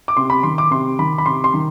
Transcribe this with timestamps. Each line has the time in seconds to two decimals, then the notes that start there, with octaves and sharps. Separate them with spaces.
0.08 D6
0.17 C3 C6
0.30 B5
0.43 D#3 C6
0.58 D6
0.71 C3 C6
0.99 D#3 B5
1.18 B5
1.26 C3 C6
1.44 C6
1.54 D#3